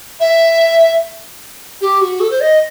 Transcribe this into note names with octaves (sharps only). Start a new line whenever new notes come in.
E5
G4
F#4
A4
C5
D#5